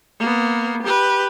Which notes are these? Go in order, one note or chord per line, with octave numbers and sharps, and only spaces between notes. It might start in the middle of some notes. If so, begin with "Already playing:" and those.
A#3 B3
G4 B4